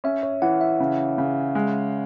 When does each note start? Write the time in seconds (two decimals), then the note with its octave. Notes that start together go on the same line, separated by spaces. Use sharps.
0.04 C#4 E5
0.23 C#5
0.42 E3 F#5
0.61 E5
0.80 C#3
1.18 C#3
1.55 G#3